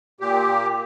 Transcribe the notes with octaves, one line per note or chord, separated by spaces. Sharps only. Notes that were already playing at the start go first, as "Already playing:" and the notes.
A#2 G4